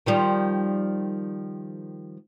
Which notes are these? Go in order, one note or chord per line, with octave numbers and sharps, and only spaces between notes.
D#3 F3 G3